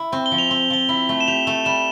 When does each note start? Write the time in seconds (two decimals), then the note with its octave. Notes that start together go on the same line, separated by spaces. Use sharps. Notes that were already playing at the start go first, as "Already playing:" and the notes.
Already playing: E4
0.12 C4
0.26 G7
0.31 F3
0.38 F7
0.51 C4 G7
0.70 F3 G7
0.89 E4
1.09 A3
1.20 E7
1.28 G4 F7
1.47 A3
1.65 G3 E7